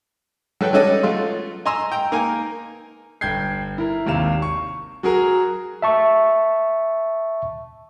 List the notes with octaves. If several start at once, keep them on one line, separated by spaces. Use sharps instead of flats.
F#3 A4 B4 G5
F#3 G3 C#4 A4 D#5
F#3 A3 F4
D#5 G#5 A#5 C6 E6
G5 A#5
A#3 D#4 G#5
G1 G5 G6 G#6 C7
E4 A#4
G#1 D#2 C3 F5 E7
C#6
F#3 F#4 G#4 A#4
E5 A5 C#6